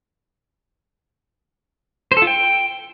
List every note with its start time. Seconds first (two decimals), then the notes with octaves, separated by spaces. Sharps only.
2.12 C5
2.17 A4
2.22 F4
2.27 G5